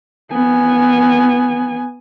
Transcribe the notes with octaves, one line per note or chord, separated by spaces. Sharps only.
B3 G#5